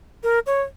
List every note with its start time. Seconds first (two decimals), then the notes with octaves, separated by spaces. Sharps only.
0.23 A#4
0.46 C#5